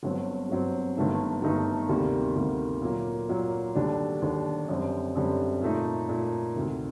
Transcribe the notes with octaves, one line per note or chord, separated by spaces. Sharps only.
G1 G2 F#3 C4
G1 G2 F#3 C4
G1 G2 D#3 A3 D#4
G1 G2 D#3 A3 D#4
D2 C3 D#3 G3 A#3
D2 C3 D#3 G3 A#3
A#2 F#3 A#3
A#2 F#3 A#3
D#2 D3 G3 D4
D#2 D3 G3 D4
F#2 D3 G3 C4
F#2 D3 G3 C4
A#2 A3 D#4
A#2 A3 D#4
D2 C3 D#3